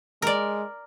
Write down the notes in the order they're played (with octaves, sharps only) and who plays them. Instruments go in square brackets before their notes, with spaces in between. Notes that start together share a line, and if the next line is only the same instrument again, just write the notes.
[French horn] G#3 [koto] A#4 D5